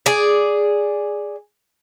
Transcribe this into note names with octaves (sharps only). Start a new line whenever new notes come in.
G#4 D5